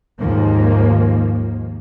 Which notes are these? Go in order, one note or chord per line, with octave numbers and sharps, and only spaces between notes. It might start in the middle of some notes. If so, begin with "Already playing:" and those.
D#2 G#2 D#3 F3 A#3